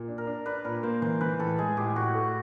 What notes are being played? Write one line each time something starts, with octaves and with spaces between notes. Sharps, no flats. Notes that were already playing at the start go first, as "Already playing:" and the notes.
Already playing: A#2
D4
A#4
D4
D4 B4
A#2 A#4
A#3 C5
E3 C5
E3 B4
A2 A4
G#3 G#4
A2 G4
A2 F#4
A3